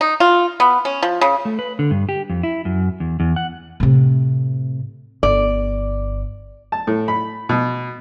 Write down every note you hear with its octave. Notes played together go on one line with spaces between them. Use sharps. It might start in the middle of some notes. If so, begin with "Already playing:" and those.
D#4
F4
B3
C#4
F3
C#3
A3
B4
D3
G2
G4
F2
E4
F#2
E2
E2
F#5
A2 C3
G1 D5
A5
A2
B5
B2